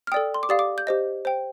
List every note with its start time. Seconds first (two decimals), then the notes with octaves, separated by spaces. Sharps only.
0.07 F6
0.12 A4 D5 G5 D#6
0.34 C6
0.43 D6
0.49 G4 D5 F5 D#6
0.59 D6
0.78 G6
0.87 G4 C5 D#5
1.25 C5 G5